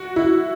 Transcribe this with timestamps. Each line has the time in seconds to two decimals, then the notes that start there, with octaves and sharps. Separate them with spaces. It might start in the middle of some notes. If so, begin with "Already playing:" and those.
Already playing: F#4
0.16 E4